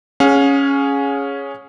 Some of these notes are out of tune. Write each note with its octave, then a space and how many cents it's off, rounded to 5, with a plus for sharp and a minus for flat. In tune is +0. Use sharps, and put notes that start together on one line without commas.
C#4 +0 G#4 +0 F5 +40